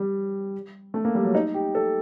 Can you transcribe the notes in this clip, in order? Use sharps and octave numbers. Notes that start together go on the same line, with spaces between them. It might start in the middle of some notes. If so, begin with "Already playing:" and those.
Already playing: G3
A3
A#3
G3
F#3
D#4
G4
A4